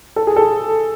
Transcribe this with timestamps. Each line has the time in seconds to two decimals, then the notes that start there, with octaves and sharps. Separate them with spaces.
0.16 A4
0.27 G#4
0.36 A4